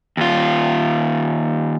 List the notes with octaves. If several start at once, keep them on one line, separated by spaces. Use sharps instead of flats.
D#2 F4